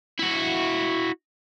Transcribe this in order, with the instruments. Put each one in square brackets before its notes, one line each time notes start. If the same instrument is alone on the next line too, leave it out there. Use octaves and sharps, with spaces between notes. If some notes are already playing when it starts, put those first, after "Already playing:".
[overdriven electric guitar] E4 F#4